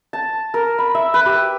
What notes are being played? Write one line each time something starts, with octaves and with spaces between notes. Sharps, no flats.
A5
A#4
B5
E5
B4
G4